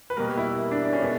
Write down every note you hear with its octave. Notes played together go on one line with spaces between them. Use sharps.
B4
B2 G3 A#3 A#4
E4
D4
D4
C#4
B2 G#3 B3